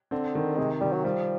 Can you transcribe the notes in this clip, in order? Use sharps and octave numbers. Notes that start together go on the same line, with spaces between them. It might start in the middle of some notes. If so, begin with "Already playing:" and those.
D3 C4
D#3
C3 G#3
D#3 G3
F#3
F3 G3